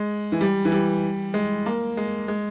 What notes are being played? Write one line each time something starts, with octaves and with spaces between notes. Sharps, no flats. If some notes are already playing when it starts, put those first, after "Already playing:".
Already playing: G#3
E3
G3
E3
G3
G#3
A#3
G#3
G#3